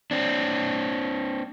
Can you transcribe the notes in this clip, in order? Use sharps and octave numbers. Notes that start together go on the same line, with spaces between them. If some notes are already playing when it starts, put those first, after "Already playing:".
C4 D4